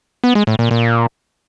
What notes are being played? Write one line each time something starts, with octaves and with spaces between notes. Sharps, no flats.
B3
G#3
A2
A#2
A#2